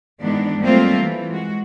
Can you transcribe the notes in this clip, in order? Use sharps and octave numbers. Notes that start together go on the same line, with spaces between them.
G#2 D#3 E3 B3 D4
F#3 G3 A3 A#3 C4 F4
E3
G#3 F#4